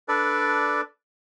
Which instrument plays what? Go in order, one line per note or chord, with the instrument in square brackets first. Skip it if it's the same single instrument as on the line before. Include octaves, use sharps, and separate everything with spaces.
[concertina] D4 A4 B4 D5